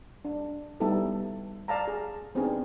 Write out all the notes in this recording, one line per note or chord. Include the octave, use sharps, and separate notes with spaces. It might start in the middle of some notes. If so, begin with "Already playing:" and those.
D4
G3 B3 D#4 E4 A4
D5 F5 A5 A#5
G#4
B3 C4 D4 D#4 G#4